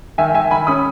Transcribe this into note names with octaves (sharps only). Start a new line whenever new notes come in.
D#3 E5 G#5
D#3 E5 G#5
D#3 G#5 B5
C#4 B5 D#6